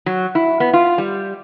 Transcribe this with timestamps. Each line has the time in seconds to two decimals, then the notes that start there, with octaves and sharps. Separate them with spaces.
0.06 F#3
0.35 E4
0.60 B3
0.73 F4
0.98 G3